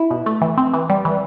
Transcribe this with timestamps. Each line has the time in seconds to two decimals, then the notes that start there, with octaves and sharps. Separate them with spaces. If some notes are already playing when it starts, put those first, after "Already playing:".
Already playing: E4
0.11 B2
0.26 A3
0.42 E3
0.58 C4
0.74 E3
0.90 G3
1.05 E3